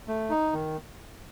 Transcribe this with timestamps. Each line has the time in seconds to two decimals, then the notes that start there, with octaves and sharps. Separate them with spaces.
0.08 A3
0.30 D#4
0.53 D#3